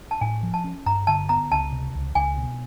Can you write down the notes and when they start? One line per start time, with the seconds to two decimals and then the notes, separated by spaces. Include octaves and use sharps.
0.11 A5
0.21 A2 G#5
0.43 F3
0.54 A5
0.64 C#4
0.86 G2 A#5
1.07 D3 A5
1.29 B3 A#5
1.51 C#2 A5
1.72 C3
1.95 C#2
2.15 C#2 G#5
2.38 B2